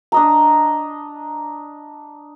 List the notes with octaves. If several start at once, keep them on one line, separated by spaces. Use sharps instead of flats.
D4 D#5 A#5